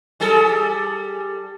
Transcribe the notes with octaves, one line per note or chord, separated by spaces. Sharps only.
G3 G#4 A4